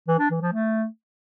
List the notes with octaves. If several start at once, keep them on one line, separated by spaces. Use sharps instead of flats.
E3
D4
E3
F3
A3